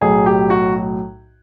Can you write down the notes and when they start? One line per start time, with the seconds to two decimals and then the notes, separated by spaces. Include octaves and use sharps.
0.01 B1 A2 F#3 G#4
0.26 G4
0.50 F#4